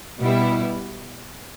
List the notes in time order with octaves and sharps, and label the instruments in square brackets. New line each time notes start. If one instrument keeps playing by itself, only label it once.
[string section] B2 G3 B3 E4